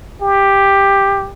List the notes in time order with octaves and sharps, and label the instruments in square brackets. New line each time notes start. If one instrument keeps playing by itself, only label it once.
[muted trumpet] G4